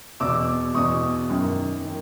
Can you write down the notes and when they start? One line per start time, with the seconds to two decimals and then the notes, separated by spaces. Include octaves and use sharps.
0.20 E2 B2 D6 E6
0.74 E2 B2 C#6 D#6
1.29 F#2 D#3
1.85 D#3